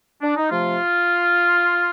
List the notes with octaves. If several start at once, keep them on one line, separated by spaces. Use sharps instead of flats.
D4
D#4
C3 F3 A3 F4